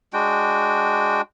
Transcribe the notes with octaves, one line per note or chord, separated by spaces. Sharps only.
G#3 D4 F#4 G5